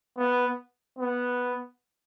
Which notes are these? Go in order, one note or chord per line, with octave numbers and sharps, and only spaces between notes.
B3
B3